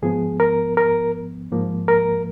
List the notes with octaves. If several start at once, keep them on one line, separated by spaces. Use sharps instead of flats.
G#2 F3 B3 G#4
A#4
A#4
G#2 F3 A#3
A#4